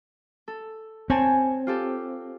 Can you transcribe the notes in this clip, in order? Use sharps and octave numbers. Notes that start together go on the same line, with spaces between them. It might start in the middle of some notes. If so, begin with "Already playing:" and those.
A4
C4 C#5 G#5 A5
F4 G4 A4